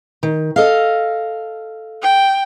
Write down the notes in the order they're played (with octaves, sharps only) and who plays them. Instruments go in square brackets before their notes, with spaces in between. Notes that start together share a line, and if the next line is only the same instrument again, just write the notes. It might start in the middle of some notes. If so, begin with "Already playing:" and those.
[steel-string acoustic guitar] D#3
A4 D#5 F5
[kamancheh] G5